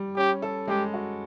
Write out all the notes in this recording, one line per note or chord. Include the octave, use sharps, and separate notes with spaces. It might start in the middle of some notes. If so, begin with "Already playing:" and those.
Already playing: G3
C#4 G4
A4
G#3 G4
F#4